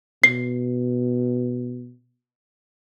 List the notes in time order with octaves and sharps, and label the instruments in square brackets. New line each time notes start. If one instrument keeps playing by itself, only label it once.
[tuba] B2 [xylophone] C7